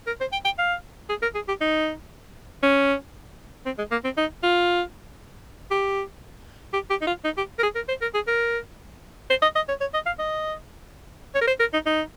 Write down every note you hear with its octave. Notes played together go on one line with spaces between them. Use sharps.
A#4
C5
G5
G5
F5
G#4
A#4
G#4
G4
D#4
C#4
C4
G#3
A#3
C4
D#4
F4
G4
G4
G4
D#4
F4
D#4
G4
A#4
G#4
A#4
C5
A#4
G#4
A#4
C5
D#5
D#5
C#5
C#5
D#5
F5
D#5
C#5
A#4
C5
A#4
D#4
D#4